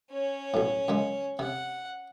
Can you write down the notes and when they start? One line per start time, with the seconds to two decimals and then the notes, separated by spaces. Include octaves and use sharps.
0.12 C#4 C#5
0.54 B1 A2
0.88 F#2 C#3 G#3
1.39 C3 F#5